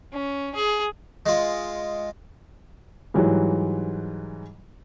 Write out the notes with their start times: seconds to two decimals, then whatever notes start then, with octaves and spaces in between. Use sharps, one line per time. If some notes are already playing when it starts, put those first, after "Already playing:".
0.13 C#4
0.55 G#4
1.26 G#3 F4
3.14 G#2 E3 F#3 G3